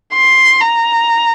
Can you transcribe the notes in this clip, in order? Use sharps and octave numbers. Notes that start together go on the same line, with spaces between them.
C6
A#5